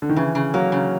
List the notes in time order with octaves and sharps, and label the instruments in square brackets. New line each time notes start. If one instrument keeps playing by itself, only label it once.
[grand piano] D3
D#3
[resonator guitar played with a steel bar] C#3 [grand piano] E3
[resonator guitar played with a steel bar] C#3
[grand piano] F#3 [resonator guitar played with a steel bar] A#3
[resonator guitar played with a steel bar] C#3